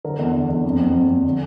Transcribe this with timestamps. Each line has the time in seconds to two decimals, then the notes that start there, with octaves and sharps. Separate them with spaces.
0.04 D3 A#4
0.19 E2
0.34 D3
0.49 E2
0.64 F2
0.79 F2
0.94 F2
1.10 F2
1.24 D3